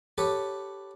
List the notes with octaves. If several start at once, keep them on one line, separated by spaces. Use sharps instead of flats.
G4 A4 B4 C#5